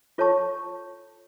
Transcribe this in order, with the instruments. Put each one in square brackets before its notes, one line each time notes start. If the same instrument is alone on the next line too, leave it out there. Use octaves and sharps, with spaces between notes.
[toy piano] F4 A4 C#5 A5 C#6